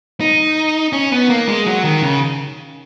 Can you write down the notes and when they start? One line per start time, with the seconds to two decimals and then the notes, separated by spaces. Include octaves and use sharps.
0.21 D#4
0.93 C#4
1.12 B3
1.30 A#3
1.48 G#3
1.66 F#3
1.84 D#3
2.03 C#3